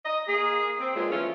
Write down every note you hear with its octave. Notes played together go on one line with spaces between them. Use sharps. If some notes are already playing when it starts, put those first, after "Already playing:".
D#5
A#3 G#4
C4
G2 A#2 F#3 G#3 A#3 F4
E3 F3 A3 C#4 E4 F4